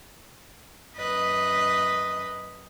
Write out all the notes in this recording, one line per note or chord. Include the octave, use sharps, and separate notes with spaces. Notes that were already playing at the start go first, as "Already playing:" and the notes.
F#2 B4 D#5